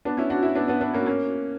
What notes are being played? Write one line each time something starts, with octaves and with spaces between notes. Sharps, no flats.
B3 D4
C#4 E4
D4 F#4
C#4 E4
B3 D4
B3 D4
B3 D4
A#3 C#4
A#3 C#4